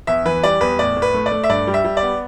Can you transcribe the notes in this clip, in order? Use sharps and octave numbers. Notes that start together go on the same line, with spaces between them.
E2 E5
E3 B4
G3 D5
E2 B4
A2 D5
A2
B4
A3
D5
A3
E5
G2 D5
G3
E5
G3
D5
B3